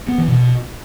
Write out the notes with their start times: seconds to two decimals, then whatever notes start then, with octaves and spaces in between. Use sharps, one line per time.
0.08 B3
0.18 E3
0.28 B2